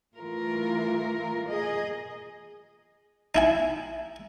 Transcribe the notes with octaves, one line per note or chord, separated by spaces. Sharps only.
E3 A3 F4 A#4
G#4 D#5
D#4 E4 G#5